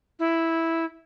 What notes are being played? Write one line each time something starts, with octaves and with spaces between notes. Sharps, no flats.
E4